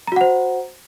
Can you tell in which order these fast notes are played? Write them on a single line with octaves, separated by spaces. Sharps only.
A#5 F#4 F#5 C5